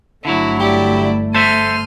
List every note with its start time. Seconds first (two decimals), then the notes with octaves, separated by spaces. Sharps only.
0.25 G1 D3 F#3 A3 E4
0.60 E4 G4 D5
1.34 A4 C5 E5 C6 F6 D#7